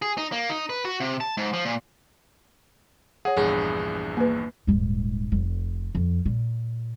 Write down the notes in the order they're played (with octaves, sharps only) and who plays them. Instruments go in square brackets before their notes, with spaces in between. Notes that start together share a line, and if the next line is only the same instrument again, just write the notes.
[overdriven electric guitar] G#4
D#4
A#3
D#4
B4
F#4
C3
A5
G#2
F3
A#2
[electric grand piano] G#4 [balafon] C#5 F#5
[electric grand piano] A#1 E2 G2 [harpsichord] G#4
[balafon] A#3 B4
[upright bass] D#1 G#2
F1
F2
A#2